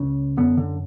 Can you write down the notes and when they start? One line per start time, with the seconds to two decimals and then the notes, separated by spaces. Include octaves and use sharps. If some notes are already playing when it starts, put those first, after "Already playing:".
Already playing: C#2 C#3
0.37 F#2 D3 B3
0.57 D3